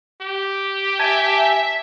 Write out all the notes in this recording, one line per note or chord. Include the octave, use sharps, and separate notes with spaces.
G4
E5 G#5 A5